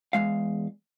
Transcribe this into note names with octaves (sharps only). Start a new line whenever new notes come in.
E2 C#3 G#3 F5